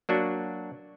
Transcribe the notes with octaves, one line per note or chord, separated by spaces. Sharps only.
F#3 A#3 D4 F#4